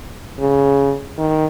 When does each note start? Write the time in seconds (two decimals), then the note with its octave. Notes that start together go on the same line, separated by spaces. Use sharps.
0.40 C#3
1.18 D#3